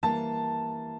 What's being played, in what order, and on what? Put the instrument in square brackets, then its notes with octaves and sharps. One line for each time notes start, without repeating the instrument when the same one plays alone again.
[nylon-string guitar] E3 G3 A#3 [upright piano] A5